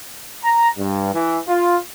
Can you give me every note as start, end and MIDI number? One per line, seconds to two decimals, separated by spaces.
0.43 0.69 82
0.78 1.11 43
1.14 1.39 52
1.48 1.76 65